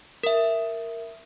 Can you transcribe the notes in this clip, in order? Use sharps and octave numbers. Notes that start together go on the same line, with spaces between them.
A#4 E5